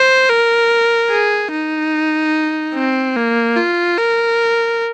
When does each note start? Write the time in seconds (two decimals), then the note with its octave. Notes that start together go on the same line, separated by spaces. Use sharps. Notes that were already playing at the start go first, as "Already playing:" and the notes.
Already playing: C5
0.29 A#4
1.10 G#4
1.52 D#4
2.74 C4
3.16 A#3
3.57 F4
3.98 A#4